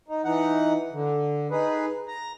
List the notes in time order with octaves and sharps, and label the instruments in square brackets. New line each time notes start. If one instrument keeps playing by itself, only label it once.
[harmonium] D#4
E3 D#4 F#5
D3
D#4 G#4 B4
A#5